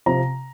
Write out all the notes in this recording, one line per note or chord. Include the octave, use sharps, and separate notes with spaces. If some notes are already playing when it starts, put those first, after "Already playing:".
C3 F3 C4 A#5